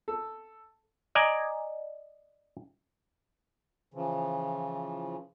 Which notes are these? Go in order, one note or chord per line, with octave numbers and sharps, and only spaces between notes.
A4
D5 D#5 G#5 A#5
C#3 E3 F3